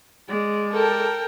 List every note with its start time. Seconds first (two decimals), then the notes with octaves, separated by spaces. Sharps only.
0.28 G#3 D5
0.73 A4 A#4 G5